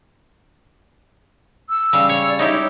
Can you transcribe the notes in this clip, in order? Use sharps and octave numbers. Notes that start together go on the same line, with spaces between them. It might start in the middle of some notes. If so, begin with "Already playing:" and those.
E6
C#3 G3
C#5
D5
D#4 E4 G4 C#5